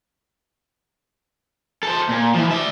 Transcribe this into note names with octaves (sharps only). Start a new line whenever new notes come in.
A4 C5
A#2
E3 F3
D5 E5